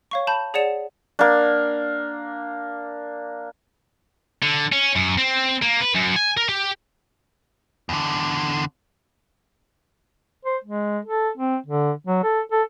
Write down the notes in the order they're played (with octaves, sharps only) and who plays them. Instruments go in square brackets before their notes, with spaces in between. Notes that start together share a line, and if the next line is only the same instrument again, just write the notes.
[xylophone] C#5 F5 C#6
A5 B5 G6
G#4 C#5 D5 F#5 C#7 E7
[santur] A#3 D4
[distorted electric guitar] D3
C#4
F#2
C4
A#3
B4
F#2
G#5
A#4
G4
[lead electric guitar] E2 D3
[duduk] C5
G#3
A4
C4
D3
F#3
A4
A4